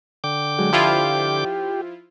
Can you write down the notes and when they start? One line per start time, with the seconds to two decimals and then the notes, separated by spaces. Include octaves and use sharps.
0.24 D3 G5 D6
0.59 F#3 G#3
0.72 F3 E4 F4 G4